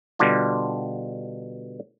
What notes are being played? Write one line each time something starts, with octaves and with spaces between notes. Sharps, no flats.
B2 D3 G3 D4 F4